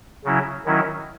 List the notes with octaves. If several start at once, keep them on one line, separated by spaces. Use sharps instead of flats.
C#3 F#3 C#4 E4
D#3 F#3 C#4 E4